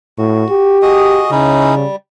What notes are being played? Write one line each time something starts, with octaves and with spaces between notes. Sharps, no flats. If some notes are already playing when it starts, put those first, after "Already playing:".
A2 F#4
G4
F#4 G#4 D#5
C#3 C#4 D#4 E4
G3